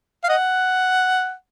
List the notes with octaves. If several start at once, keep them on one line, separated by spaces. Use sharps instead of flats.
F5
D#5 F#5